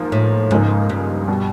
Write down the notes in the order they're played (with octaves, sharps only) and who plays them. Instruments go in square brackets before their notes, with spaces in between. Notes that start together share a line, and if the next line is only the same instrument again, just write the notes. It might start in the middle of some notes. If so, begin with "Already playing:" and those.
Already playing: [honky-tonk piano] G#2 F3 A#3
[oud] A2
[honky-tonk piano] C#2 C#3 F3 A#3 D#4 [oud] G#2
[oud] G2
[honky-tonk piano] B2 G3